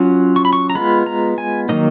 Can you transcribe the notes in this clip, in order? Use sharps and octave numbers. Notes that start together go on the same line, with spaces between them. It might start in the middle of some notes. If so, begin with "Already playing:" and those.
Already playing: F#3 C#4 F4
C#6
B5
C#6
A#5
G#3 B3 F4 B5
A#5
G#5
D#3 F#3 A#3 D#4 D#5